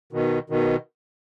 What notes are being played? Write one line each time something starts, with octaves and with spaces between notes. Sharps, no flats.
B2 D#3
B2 D#3